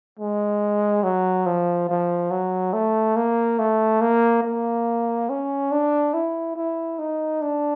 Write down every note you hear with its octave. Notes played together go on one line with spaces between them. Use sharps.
G#3
F#3
F3
F3
F#3
A3
A#3
A3
A#3
A#3
C#4
D4
E4
E4
D#4
D4